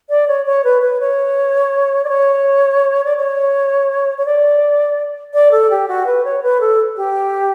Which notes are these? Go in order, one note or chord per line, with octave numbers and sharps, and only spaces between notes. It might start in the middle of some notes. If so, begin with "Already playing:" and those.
D5
C#5
C#5
B4
B4
C#5
D5
C#5
D5
C#5
C#5
D5
D5
A4
G4
F#4
B4
C#5
B4
A4
G4